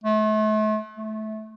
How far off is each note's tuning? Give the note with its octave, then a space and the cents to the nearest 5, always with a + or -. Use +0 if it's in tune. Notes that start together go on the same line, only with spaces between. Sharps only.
A3 -40
A3 -20